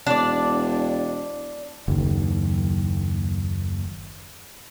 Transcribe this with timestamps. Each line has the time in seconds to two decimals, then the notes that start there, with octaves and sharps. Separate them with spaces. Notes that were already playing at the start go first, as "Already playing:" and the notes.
0.07 E1 D4 D5
1.88 F#1 D#2